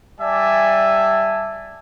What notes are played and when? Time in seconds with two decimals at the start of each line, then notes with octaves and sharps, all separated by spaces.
0.20 G3 D5 E5 G#5 A5